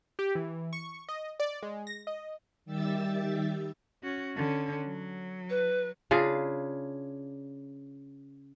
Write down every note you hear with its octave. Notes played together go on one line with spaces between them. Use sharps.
G4
E3
C#6
D#5
D5
G#3
A#6
D#5
D#3 G3 G4 E5 E6 A6
C#4 F#4
D3 C#4
F#3
B4
C#3 D4 F4 G#4